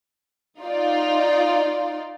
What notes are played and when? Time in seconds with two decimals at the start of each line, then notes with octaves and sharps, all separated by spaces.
0.61 D#4 F4 D5